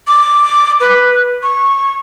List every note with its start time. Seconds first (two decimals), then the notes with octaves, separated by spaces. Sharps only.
0.08 D6
0.80 B4
1.43 C#6